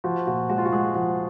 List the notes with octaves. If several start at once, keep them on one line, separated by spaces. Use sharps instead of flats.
F3 F#4
A#2 F#4
G#3 F#4
F4
F#4
G#3 G#4
F3 F#4